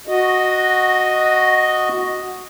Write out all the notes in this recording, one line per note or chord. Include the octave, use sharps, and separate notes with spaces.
F#4 D#5